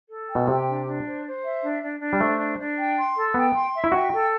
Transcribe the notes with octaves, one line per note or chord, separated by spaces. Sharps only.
A4
G5
B2
C3 G4
D4
D4
C5
C5
E5
D4
D4
D4
G3
A3 C5
D4
D4
G5
C6
A4
B3 G5
C6
E5
E4
F#4 G5
A4